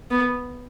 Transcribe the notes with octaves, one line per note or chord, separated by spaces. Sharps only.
B3